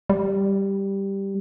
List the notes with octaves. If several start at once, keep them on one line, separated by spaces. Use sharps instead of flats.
G3